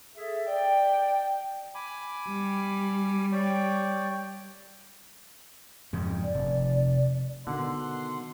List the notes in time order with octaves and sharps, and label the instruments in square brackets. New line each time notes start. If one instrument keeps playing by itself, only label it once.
[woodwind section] G#4 A4 E5
[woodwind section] D5 [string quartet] G5
[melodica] G#5 B5 D6
[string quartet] G3
[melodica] C#5 D5 G5
[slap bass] F2 G#2 C#3
[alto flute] D5
[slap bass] F1
[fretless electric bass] B2 D#3 [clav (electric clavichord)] D3 [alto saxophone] F#5 [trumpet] C6